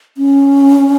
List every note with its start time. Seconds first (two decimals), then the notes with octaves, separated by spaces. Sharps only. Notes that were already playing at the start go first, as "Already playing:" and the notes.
0.17 C#4